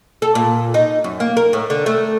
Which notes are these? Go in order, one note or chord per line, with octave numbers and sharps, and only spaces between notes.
A4
A#2
D#4
F#2
A#3
A#4
A2
D3
A3